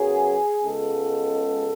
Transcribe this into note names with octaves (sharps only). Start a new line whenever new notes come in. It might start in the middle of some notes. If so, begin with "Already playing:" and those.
Already playing: F#2 C#3 F#3 B3 G#4
C#2 C#3 G#3 B3 A4